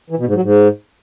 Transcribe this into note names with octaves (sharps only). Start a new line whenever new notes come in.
E3
B2
G#2
F#3
G#2